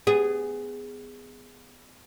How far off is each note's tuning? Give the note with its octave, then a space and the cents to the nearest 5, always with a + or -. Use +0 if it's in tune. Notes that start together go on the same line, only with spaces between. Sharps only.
B3 +25 G#4 -10